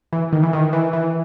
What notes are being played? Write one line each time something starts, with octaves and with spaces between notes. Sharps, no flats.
E3
D#3
E3
D#3
E3
E3